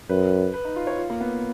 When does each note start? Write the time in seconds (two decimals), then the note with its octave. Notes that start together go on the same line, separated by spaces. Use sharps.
0.09 F#2 B4
0.54 B4
0.65 D#4
0.76 F4
0.87 C#5
0.98 F4
1.10 A#3
1.21 B3